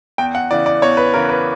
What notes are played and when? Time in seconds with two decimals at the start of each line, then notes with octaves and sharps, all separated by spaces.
0.18 E2 G5
0.35 F#5
0.51 C#3 E3 D5
0.66 D5
0.82 E2 C#5
0.97 B4
1.14 C#3 E3 A#4
1.29 B4